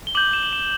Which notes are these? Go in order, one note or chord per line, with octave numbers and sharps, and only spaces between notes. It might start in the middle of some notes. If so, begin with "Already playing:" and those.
G7
D6 G6 F#7
E7
F#7
E7